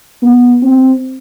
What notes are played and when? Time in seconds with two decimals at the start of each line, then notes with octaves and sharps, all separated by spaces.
0.23 B3
0.63 C4